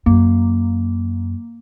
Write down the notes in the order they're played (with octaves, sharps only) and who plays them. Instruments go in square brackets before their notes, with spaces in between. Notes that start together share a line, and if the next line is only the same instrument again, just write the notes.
[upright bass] F#2 [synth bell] A#3